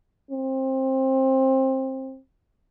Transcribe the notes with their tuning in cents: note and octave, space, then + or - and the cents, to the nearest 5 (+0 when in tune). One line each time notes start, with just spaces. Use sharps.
C4 +20